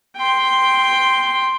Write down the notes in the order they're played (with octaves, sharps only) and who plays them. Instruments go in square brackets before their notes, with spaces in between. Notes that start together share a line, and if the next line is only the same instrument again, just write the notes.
[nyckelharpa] G5 C6